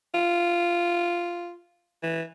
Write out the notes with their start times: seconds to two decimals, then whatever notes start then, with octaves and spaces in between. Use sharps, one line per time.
0.14 F4
2.03 E3